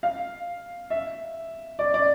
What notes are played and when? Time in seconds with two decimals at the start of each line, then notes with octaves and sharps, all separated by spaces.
0.03 F5
0.90 E5
1.79 D5
1.94 D5